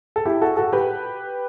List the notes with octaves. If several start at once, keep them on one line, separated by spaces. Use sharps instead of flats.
A4
E4 G4
F#4 A4
F#4 A4
G4 B4